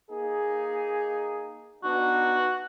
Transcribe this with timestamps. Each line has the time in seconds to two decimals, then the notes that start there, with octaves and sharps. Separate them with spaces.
0.11 A#3 D#4 G#4
1.83 B3 D4 D#4 F#4